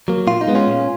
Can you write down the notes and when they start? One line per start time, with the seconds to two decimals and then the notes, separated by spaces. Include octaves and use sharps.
0.08 F#3 A#3
0.27 A#2 F4
0.41 D#4
0.47 G#3 B3
0.55 C#4 F4
0.67 A#2